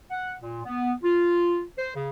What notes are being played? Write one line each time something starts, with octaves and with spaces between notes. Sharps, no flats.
F#5
A#2
B3
F4
C5
C#3